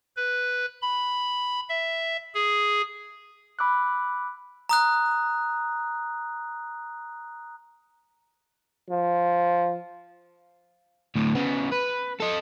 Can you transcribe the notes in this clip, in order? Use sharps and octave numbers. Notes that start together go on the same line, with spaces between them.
B4
B5
E5
G#4
B5 D6 E6 F#6
A#5 D#6 F#6
F3
D2 A2
C#3 B3
B4
A4 D#5